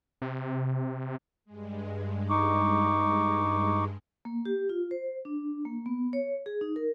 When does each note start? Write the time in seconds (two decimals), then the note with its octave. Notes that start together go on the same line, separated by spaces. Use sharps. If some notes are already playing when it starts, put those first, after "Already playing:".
0.22 C3
1.45 G2 G#3
2.30 D#4 C#6 D6
4.25 A#3
4.45 G4
4.69 F4
4.91 C5
5.25 D4
5.65 A#3
5.86 B3
6.13 C#5
6.46 G#4
6.61 D#4
6.76 A#4